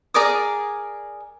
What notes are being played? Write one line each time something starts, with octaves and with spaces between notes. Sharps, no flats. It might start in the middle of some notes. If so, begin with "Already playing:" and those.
G#4 A#4 D5 D#6